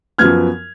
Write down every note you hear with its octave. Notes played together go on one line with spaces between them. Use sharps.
F#2 F3 B3 F6 G#6